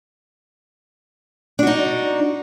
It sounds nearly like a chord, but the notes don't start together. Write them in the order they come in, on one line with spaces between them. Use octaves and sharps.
D4 F#4 D#4